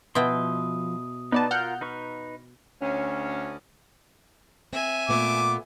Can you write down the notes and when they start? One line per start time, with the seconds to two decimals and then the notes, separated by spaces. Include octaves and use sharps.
0.15 B2 F3 E4 G5 C6 D#6
1.32 B3 D#4 B4 D5 A5
1.51 F4 A#4 F#5 F6 G6
1.81 D#4 B4 C#6
2.82 D2 C#4
4.73 C4 E5 G#5
5.09 A#2 A3 B3 D6